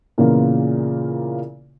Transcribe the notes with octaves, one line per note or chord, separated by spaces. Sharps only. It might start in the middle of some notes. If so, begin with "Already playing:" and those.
A#2 C#3 E3 A#3 B3 F4